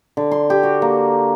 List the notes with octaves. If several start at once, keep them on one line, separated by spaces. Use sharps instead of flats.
D3
C6
G4
F#4
A#3